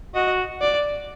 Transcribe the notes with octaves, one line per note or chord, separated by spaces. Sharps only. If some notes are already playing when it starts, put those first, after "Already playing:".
F#4 D#5
D5